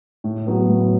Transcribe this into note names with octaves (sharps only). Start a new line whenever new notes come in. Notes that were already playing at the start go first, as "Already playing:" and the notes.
A2
F#3 B3
A2